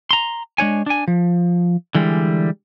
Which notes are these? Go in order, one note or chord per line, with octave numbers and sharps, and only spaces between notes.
A#5 C6
G#3 D4 C#5 G#5
D4 G#5
F3
D3 E3 G3 G#3